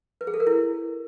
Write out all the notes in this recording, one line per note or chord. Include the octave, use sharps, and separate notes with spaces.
B4
G#4
A4
A#4
E4